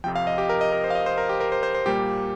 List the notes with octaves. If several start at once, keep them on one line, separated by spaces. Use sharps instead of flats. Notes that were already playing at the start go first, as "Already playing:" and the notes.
F2 C3 F3 G5
F5
D#5
G4
A#4
D#5
A#4
C5
F5
D#5
C5
A#4
G4
A#4
C5
C5
C5
A#2 G3 A#3 G4